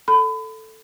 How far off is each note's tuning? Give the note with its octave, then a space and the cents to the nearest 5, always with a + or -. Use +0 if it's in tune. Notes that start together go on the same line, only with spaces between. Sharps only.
A4 +0 B5 +30